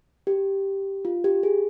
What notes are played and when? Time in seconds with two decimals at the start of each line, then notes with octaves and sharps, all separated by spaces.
0.27 G4
1.05 F4
1.24 G4
1.43 G#4